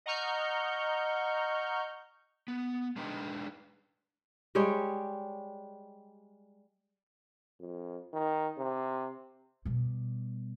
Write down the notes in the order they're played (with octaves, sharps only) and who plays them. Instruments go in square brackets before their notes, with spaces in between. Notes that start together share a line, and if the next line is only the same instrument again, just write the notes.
[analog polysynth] D#5 F#5 A#5 C#6 F6 G6
[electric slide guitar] B3
G#3 D4 D#4 B4 D#5 G5
[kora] G3 G#3 G4 C#5
[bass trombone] F2
D#3
C3
[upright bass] B2 G3